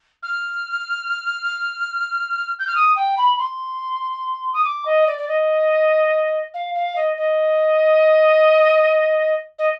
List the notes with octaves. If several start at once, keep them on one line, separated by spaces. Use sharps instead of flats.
F6
G6
F6
D#6
G5
B5
C6
D#6
D6
D#5
D5
D5
D#5
F5
F5
D#5
D#5
D#5